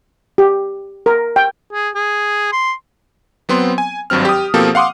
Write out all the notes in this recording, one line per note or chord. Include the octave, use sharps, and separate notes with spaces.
G4
A#4
G5
G#4
G#4
C6
F#3 B3 C4 C6
G#5
G#1 G2 F#3 C4 F6
G4 D#6
B2 F3 A#3 C4 G4 A4
F5 F#5 C6 D6 D#6